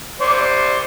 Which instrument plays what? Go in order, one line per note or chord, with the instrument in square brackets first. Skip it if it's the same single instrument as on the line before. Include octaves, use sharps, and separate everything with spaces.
[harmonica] C5 D5